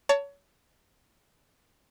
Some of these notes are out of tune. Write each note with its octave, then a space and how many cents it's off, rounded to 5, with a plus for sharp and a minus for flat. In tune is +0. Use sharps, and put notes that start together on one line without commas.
C#5 +25 A5 +25